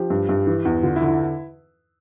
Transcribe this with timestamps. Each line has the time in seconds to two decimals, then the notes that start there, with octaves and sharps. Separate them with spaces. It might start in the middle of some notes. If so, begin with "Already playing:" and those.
Already playing: F3 G4
0.10 G2
0.29 G2
0.47 E3
0.65 E2
0.83 D3 F4
0.96 E4
1.02 D3
1.08 E4